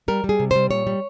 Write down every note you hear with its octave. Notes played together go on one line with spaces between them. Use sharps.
G3 A#4
G3
G#4
C3
G3 C5
A#2 C#5
G3